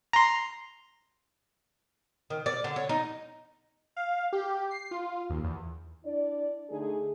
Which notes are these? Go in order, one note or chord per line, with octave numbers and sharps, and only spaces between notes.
A#5 C6
D#3
D5
D3
C#5
D#4
F5
G4
C7
F4
D#2
E2
D4 E4 D5
D3 A3 D#4 G#4